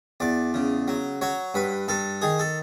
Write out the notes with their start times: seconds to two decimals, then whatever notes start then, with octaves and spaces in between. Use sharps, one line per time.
0.20 E2 D5
0.54 C#3
0.88 F#3
1.21 F#3 C#5
1.54 G2 B4
1.88 G2 A4
2.22 D#3 G#4
2.39 A4